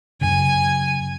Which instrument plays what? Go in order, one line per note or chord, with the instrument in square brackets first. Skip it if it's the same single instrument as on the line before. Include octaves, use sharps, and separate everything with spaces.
[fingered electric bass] F#2 C#3 [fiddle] G#5